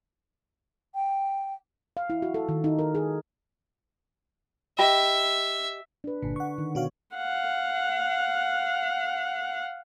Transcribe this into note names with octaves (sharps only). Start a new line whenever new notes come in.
G5
F5
E4
F#4
A4
D#3
D#4
A#4
G#4
G4 D#5 E5 B5
D4 B4
G1 A#2 D3
F#5 C#6
D#3
B2 D4 F#4 C#5 F5
F5 F#5